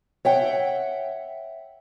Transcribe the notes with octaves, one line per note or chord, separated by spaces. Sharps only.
C#5 E5 F#5 G5